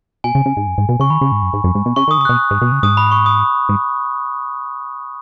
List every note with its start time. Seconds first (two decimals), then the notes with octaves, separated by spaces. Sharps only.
0.24 B2 G#5
0.35 C#3
0.46 C#3
0.57 G#2
0.67 F#2
0.78 G#2
0.89 B2
1.00 C#3 C#6
1.10 D#3 B5
1.21 C#3
1.32 G#2
1.42 F#2
1.53 G#2
1.64 F#2
1.75 G#2
1.86 B2
1.96 C#3 C#6
2.08 D#3
2.11 D#6
2.18 C#3
2.21 D#6
2.25 B2 F#6
2.51 G#2
2.62 B2
2.72 C#3
2.83 G#2 D#6
2.97 B5
3.11 C#6
3.26 D#6
3.69 G#2